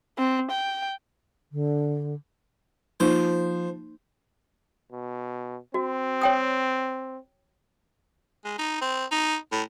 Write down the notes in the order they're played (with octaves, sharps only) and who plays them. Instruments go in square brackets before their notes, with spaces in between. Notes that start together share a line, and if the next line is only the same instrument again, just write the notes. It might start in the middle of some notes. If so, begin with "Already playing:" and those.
[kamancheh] C4
G5
[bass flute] D3
[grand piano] F3 [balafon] A#3 D#4 [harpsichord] C5
[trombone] B2
[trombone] C4 [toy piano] F#4
[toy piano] C#5 G5 D#6
[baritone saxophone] G#3
D#4
C4
D#4
A2